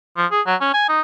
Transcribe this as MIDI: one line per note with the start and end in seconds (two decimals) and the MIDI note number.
0.17 0.26 53
0.31 0.41 68
0.46 0.55 54
0.61 0.70 61
0.74 0.87 80
0.89 1.01 63